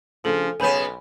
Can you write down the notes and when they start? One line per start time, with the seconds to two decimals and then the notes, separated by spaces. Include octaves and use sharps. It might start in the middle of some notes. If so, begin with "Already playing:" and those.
0.25 C#3 F3 D4 G#4 A4
0.60 B1 C#3 B3 B4 C#5 G#5 B5 G6